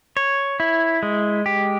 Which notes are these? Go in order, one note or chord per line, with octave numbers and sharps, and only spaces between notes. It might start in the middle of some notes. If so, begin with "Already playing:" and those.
C#5
E4
G#3
G4